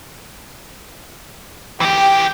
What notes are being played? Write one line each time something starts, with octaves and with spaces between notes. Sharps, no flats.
E3 G4 G5